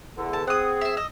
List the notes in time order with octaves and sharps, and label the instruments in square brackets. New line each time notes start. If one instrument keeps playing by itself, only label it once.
[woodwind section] E2 D3
[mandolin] A5
[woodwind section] C4 G#4 [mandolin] F#5 D#6
[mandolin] C5 E5
D#5 E6